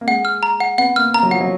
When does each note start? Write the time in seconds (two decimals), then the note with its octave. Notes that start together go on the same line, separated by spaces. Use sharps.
0.01 A#3
0.07 G#3 F#5
0.25 F6
0.43 A#5
0.60 F#5
0.78 B3 F#5
0.96 A#3 F6
1.14 A#3 A#5
1.23 F#3
1.31 F3 F#5
1.41 F#3